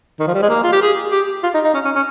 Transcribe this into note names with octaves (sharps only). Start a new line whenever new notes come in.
D#3
F3
G3
G#3
A#3
F4
G4
G#4
G4
F4
D#4
D#4
C#4
C#4
C#4